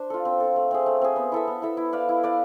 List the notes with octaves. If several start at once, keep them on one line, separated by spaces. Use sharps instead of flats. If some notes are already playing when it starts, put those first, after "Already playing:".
Already playing: D4 C5
F4 A4
C4
F4 A4
A3
C4 G#4
A3
C4 G#4
B3
E4 A4 E5
B3
E4 A4 E5
E4
B4 D5 F5
E4
B4 D5 F5